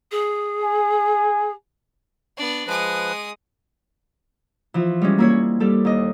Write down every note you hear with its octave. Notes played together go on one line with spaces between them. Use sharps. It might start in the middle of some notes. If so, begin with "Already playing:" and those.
G#4
G#5
B3 D4
F3 G#3 B4 D#6
E3 F3
G3 G#3 C#4
A#3 E4 C#5
C4
G3 G4 A4
D#2 D#5